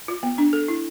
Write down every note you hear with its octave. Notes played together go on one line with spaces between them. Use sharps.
F4
B3
D4
A4
E4